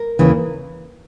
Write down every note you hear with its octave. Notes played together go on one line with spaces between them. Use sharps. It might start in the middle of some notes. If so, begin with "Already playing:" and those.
Already playing: A#4
D#2 C#3 E3